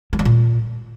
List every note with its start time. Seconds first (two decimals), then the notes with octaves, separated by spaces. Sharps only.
0.13 F#3
0.19 G3
0.25 A#2